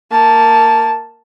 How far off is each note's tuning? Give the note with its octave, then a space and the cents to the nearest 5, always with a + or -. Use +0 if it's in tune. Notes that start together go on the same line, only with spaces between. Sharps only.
A#3 -10 A5 +0